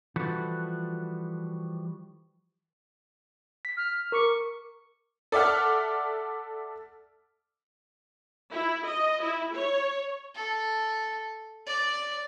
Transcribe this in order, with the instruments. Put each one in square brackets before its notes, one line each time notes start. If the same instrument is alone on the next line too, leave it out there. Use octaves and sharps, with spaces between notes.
[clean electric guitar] E3 F3 G3 F#4 A4 B4
[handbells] B6
[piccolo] F6
[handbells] A#4 D6 C#7 [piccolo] C#6
[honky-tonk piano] A4 D5 E5 F#5 F6
[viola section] E4
D#5
E4
C#5
[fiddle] A4
D5